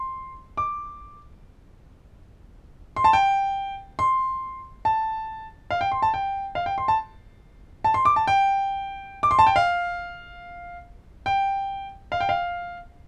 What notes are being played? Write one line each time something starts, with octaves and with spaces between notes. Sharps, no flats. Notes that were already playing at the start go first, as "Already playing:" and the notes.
Already playing: C6
D6
C6
A5
G5
C6
A5
F5
G5
C6
A5
G5
F5
G5
C6
A5
A5
C6
D6
A5
G5
D6
C6
A5
G5
F5
G5
F5
G5
F5